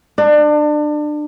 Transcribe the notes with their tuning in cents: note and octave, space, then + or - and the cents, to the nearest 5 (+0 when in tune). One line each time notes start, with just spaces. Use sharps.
D4 +30